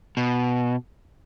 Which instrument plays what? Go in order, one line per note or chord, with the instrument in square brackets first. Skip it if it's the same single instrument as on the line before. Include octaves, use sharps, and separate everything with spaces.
[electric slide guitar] B2